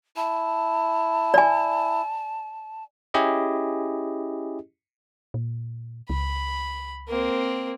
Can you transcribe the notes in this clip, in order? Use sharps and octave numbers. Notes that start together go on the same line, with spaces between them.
E4 A5
D5 G#5
C#4 E4 G4 G#4 D#5
A#2
C#2 B5
A#3 C4